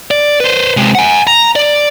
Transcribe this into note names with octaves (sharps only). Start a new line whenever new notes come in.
D5
B4 C5
C3 G#3
F#5 G#5
A#5
D5